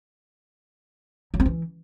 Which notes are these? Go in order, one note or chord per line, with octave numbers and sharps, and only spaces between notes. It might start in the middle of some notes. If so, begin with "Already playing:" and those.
F#3
C4
E3